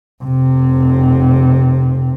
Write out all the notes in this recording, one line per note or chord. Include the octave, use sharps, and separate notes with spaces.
F1 C3